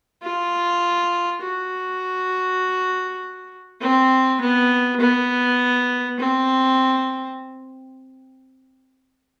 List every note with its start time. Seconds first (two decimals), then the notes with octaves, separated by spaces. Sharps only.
0.22 F4
1.42 F#4
3.81 C4
4.40 B3
5.00 B3
6.19 C4